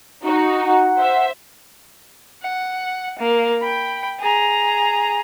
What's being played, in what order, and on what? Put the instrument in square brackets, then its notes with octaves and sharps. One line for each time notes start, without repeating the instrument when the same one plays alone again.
[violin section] D#4 F#4
[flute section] F#5
[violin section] C5 E5
[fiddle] F#5
A#3
G5 B5
G#4 A#5